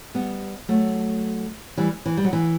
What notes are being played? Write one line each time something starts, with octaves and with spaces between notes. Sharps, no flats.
G3 B3
F#3 A3
E3 G3
E3
G3
F#3
E3